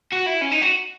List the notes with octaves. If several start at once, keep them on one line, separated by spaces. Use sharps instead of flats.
F#4
E4
C#4
D#4
F#4